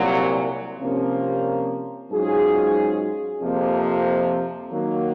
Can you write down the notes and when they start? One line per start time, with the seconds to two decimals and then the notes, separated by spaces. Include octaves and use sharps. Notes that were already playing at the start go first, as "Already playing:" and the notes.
Already playing: C2 A#2 F#3
0.79 C3 F3 A#3 C#4
2.10 G#2 F#3 C#4 F4 G#4
3.40 F2 C3 F3 A#3
4.72 D#3 F#3 A#3